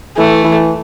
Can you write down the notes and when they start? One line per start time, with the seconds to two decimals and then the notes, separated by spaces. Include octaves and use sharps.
0.17 E3 A3
0.44 E3